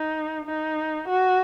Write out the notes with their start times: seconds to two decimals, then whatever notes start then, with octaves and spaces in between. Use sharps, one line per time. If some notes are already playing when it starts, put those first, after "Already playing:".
Already playing: D#4
0.45 D#4
1.08 F#4